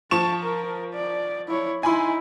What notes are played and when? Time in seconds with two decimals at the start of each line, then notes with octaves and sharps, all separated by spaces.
0.11 F3 A5 C#6 E7
0.43 A#4
0.94 D5
1.48 E4 C#5
1.83 D#4 E4 G#5 B5 C6